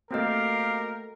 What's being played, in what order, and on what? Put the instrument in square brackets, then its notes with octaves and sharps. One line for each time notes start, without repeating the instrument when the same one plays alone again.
[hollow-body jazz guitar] A3 C4 [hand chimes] A#3 F#4 D#5 [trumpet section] G4 F5 [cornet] A#4